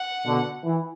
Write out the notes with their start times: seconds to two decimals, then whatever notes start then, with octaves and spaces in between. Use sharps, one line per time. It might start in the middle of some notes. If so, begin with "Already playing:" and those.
Already playing: F#5
0.26 B2 D3
0.65 E3